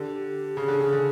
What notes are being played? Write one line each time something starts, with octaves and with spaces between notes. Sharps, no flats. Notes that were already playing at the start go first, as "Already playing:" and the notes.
Already playing: D3 G4
C#3 G#4
D3
C#3
D3